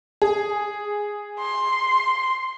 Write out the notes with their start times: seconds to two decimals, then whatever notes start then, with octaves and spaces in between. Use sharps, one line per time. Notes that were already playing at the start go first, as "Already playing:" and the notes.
0.22 G#4
1.39 C6